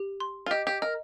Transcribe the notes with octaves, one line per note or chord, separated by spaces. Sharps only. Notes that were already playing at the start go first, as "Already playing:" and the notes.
Already playing: G4
C6
F4
G4 D#5
G4
A#4 D#5